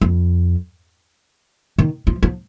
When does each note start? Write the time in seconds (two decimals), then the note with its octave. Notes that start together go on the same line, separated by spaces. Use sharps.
0.01 F2
1.78 D#3
2.07 F3
2.23 F3